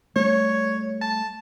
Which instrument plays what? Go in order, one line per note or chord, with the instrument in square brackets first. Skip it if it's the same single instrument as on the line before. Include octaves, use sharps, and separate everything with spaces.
[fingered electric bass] G3 A3 [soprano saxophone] C#5
[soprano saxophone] A5